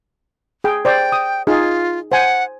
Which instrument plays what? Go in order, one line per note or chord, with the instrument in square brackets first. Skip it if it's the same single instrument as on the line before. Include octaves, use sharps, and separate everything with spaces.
[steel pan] G#4 G5
[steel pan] C5 D5 [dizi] G5
[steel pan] D#6
[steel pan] D#4 G#4 [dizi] F4
[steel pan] C5 G#5 [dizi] F#5